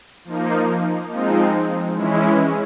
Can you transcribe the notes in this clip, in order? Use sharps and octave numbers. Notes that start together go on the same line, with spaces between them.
F3 A#3 D#4
F3 G#3 C4 D#4
E3 G#3 C#4 E4